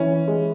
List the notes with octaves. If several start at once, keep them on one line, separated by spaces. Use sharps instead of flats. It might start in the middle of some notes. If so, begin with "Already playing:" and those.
Already playing: E3 C#4
G#3